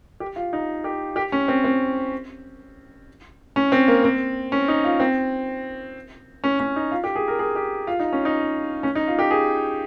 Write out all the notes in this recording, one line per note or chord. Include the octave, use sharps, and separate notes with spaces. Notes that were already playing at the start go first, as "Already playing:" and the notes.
G4
F4
D#4
G4
G4
C#4
C4
C4
C#4
C4
A#3
C4
C#4
D#4
F4
C4
C#4
C#4
D#4
F4
G4
G#4
A#4
G#4
G4
F4
D#4
C#4
D#4
C#4
D#4
F4
G4
G#4